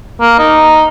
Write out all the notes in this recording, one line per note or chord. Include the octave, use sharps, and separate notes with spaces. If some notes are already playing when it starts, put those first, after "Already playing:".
A#3
D#4